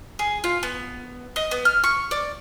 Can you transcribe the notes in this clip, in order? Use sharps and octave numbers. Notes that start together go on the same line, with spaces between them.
G#4
F4
B3
D#5
B3
F6
C#6
D5